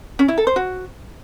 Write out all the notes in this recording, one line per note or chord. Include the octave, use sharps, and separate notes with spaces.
C#4
E4
A4
C5
F#4